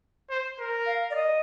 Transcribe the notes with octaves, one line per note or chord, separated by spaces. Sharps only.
C5
A#4
F5
D5
D#5